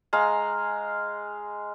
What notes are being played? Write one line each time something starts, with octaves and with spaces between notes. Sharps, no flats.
G#3 F5 A#5